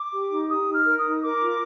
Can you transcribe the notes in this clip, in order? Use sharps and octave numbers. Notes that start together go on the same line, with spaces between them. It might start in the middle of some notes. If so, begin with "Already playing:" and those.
Already playing: D6
G4
D#4
G4 D#6
D#4
F6
A#4
D#6
D#4
A#4 D6
F4